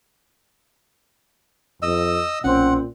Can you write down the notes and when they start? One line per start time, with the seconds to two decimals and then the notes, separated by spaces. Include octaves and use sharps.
1.82 F2 D#5 E6
2.44 B1 A#2 C4 C#4 F#5